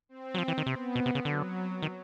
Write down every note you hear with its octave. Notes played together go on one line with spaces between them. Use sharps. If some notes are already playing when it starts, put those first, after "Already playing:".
C4
F#3
F3
E3
D#3
C3 B3
B2
C3
C#3
D3 F#3
D#3